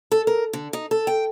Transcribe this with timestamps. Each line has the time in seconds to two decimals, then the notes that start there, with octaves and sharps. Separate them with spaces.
0.12 A4
0.27 A#4
0.53 D3
0.73 D#4
0.91 A4
1.07 G5